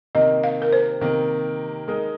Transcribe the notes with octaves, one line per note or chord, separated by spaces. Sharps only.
C3 D#3 A#3 D#5
F5
A#4
C5
C3 D#3 A#3
G#3 D#4 A#4